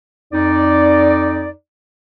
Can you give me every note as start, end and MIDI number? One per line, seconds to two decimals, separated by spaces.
0.33 1.50 41
0.33 1.50 63
0.33 1.50 74